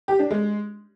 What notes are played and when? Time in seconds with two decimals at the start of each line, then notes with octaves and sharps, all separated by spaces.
0.08 G4
0.19 D4
0.31 G#3